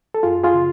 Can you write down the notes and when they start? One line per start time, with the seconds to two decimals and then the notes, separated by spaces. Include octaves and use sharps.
0.14 A4
0.23 F#2 F4 G#4
0.44 F4 G#4
0.54 C#3